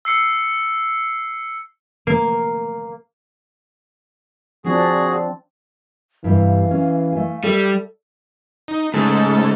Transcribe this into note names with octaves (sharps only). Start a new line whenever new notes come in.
E6 C7 C#7
A#3
F3 C4 D4 F#4 G#4
G2 C3 E3 F5
C#4
A3 G#5
G3 A4 D5
D#4
G#2 C#3 A3 A4